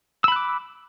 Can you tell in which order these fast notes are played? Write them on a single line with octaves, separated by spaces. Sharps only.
E6 B5 F#6 D6